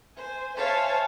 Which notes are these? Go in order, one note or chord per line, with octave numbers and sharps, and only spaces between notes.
C5 G#5
C5 C#5 E5 F5 G#5 A5